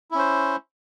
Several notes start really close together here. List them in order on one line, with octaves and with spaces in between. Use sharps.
E4 C#4 C5